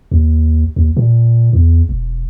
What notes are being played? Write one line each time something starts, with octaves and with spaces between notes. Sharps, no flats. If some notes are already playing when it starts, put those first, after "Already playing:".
D#2
D#2
A#2
E2
E1